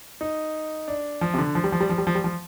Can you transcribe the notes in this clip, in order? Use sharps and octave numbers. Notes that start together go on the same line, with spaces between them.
D#4
D4
F3
C3
D3
F3
G3
F3
G3
F3
G3
F3
G3
F3